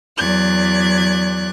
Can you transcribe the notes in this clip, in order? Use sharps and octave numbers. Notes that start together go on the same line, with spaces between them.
E2 F#3 D5 F#6 G#6